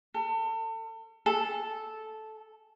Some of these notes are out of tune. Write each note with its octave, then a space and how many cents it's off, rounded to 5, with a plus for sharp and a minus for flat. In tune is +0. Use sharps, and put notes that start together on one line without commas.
A4 +35
A4 -10